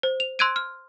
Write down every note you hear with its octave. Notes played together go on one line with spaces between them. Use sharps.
C5
F7
C6 E6 F#6 G#6 D7 D#7
F6